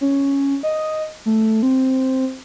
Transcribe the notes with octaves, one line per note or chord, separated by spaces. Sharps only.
C#4
D#5
A3
C4